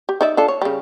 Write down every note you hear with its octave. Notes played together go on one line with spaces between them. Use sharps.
G4
D#4 D5 E5
D4 F4 A4
C#5
C#3 G3